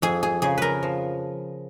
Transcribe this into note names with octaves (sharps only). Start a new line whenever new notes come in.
F2 G#4
G#4
C#3 G#4
A#4 B4
F3